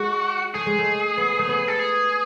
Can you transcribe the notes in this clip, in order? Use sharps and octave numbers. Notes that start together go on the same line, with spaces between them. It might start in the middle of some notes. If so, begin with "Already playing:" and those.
Already playing: G#3 F#4
A3 G#4
G#3
A3
B3
A3
B3
A4
G#4